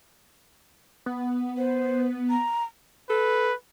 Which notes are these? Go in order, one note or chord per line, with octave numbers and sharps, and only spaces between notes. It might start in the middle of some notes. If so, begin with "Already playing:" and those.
B3
C5
A#5
A4 B4